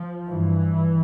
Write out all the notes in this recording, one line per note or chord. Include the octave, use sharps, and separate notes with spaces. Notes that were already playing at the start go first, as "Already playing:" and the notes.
Already playing: F3
G2 E3